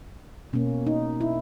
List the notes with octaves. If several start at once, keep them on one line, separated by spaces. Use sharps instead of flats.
B2 A#3 C#4
D#4
E4